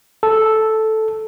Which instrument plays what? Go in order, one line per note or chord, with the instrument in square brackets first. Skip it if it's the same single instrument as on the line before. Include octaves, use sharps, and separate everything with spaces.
[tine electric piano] A4